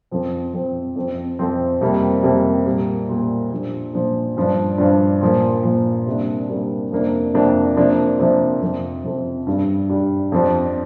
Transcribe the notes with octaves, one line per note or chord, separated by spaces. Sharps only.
F2 F3 C4
F2 F3 C4
F2 F3 C4
F2 F3 C4
F2 C3 G3 A#3
F2 C3 G3 A#3
A#2 G3 A#3
A#2 G3 A#3
A#2 F3 D4
A#2 F3 D4
G2 F3 D4
G2 F3 D4
A#2 F3 A#3
A#2 F3 A#3
C3 G3 A#3 D4
C3 G3 A#3 D4
F2 C3 A#3 D4
F2 C3 A#3 D4
C3 F3 A#3 D4
C3 F3 A#3 D4
F2 C3 F3
F2 C3 F3
G2 G3 D4
G2 G3 D4
F2 F3 D4